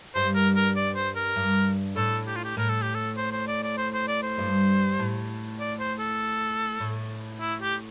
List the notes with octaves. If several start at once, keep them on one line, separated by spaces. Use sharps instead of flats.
G2 C5
A#4
A#4
D5
C5
A#4
G2
A2 A4
G4
F4
G4
A2 A#4
A4
G4
A4
C5
C5
D5
D5
C5
C5
D5
C5
G2
A2
D5
C5
A4
A2
E4
G4